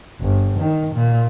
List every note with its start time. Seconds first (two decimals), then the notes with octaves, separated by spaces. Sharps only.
0.21 G1
0.60 D#3
0.94 A#2